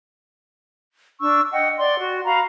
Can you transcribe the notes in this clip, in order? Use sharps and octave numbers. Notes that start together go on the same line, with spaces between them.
D4 C#6 E6
D#5 F#5 G5
D5 C6
F#4
F#4 F5 A#5 B5